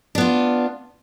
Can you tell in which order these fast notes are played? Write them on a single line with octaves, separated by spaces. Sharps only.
D4 B3 F4